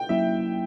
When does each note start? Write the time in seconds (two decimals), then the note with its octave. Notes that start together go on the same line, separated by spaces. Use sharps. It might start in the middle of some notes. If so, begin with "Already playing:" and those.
Already playing: G5
0.09 F#3 A#3 C#4 E4 E5